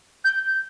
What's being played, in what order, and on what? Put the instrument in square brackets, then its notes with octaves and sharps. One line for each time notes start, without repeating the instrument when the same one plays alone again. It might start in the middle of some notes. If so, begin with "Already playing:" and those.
[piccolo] G6